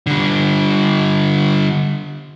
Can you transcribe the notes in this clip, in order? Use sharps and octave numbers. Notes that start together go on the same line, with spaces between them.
D3 G3